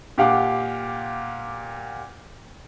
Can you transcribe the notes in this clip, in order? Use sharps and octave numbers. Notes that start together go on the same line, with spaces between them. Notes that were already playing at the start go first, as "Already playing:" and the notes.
A#2 G4 F5 F#5 D6